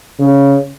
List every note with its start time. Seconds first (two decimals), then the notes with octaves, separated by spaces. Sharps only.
0.19 C#3